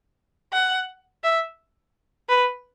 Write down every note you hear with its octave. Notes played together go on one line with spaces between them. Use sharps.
F#5
E5
B4